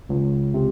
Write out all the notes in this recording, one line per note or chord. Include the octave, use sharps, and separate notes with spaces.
C#2
C3